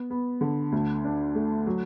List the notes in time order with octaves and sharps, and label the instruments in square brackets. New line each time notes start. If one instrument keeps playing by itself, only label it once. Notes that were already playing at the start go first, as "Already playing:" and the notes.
Already playing: [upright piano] B3
B3
D3
D2
D4
A3
F#3